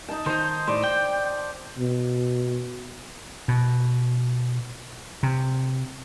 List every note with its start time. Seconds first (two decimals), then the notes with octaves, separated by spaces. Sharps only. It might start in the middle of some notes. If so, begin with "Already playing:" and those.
0.09 D#4 A5
0.26 D#3 D#4 C5
0.68 A2 C5 D5
0.84 G5
1.78 B2
3.48 B2
5.23 C3